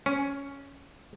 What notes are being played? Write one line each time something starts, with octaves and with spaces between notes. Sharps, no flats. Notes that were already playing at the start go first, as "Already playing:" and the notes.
C#4